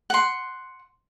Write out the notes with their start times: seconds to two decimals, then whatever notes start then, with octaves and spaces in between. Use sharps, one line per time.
0.10 F#5 C6